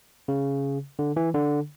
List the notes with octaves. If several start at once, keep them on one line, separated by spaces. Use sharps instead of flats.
C#3
D3
E3
D3